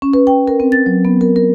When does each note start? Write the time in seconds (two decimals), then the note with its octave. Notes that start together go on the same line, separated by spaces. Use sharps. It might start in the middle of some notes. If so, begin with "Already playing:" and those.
0.02 C#4
0.14 B4
0.27 G5
0.48 A#4
0.60 C4
0.72 A6
0.86 F#3
1.05 B3
1.21 A#4
1.36 A#4